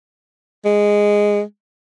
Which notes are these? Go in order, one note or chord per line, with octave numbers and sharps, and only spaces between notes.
G#3